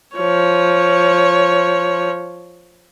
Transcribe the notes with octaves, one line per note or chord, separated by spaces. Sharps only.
F3 C#5